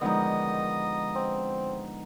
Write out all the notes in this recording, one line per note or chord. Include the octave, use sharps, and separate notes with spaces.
D3 D#3 F3 G#3 B3 D#4 D#5
C4